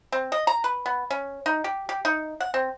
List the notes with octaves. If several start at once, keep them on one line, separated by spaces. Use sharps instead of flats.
C4
D#5
A#5
B4
B3
C#4
D#4
G4
G4
D#4
F#5
C4